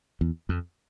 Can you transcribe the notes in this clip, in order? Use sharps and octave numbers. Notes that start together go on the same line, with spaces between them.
E2
F2